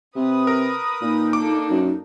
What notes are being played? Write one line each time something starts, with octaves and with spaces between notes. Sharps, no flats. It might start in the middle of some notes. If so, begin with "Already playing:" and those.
C3 B4 D#6
A#4
A#2 D#4
A#3 D4 A4 D6
F#2